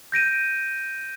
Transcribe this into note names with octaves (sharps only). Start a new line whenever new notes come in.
G6 A#6 D7 D#7